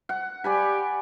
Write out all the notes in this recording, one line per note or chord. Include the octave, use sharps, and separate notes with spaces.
F#5
G4 D5 G#5 B5